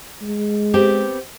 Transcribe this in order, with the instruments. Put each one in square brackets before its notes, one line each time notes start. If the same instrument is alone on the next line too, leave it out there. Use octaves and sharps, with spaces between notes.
[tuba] G#3
[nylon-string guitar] B3 C4 G4